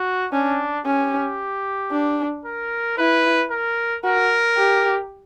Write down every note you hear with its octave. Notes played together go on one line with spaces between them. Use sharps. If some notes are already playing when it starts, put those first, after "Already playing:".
Already playing: F#4
C#4 D4
C#4 G4
D4
A#4
E4 B4
A#4
F#4 A#4
G4